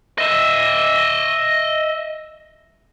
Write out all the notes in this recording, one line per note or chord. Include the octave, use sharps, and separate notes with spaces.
D#5 E5